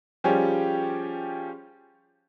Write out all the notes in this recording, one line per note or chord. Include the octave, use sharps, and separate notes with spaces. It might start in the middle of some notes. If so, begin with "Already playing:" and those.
F3 G3 C#4 G4 G#4 C#5